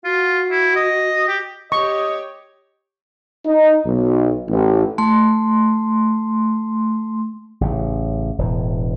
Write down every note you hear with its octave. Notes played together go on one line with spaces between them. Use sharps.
F4 F#4
E4
D#5
G4
G4 C#5 D#5 C#6
D#4
B1
A1
A3 C6
A1 C#3
E1 A2